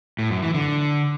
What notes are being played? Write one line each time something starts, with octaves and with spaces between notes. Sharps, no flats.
A2
F#2
E3
D3